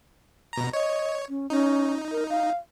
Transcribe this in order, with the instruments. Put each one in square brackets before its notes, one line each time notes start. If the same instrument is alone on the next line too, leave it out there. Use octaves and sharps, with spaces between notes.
[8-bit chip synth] B2 A#5
[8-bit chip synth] C#5 [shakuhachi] D#5
[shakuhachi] C#4
[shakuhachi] C#4 [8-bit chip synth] D#4
[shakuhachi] A#4
F5